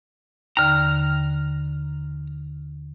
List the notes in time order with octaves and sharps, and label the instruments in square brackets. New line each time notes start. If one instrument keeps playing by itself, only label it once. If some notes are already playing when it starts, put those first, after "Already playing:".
[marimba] D#2 D3 [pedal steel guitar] A#5 F6